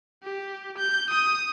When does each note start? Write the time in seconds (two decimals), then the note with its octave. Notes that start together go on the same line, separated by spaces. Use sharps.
0.23 G4
0.78 G6
1.10 D#6